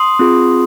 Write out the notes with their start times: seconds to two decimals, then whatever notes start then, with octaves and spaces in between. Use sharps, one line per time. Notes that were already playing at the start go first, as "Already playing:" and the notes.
Already playing: C6 D#6
0.19 C4 F4 G#4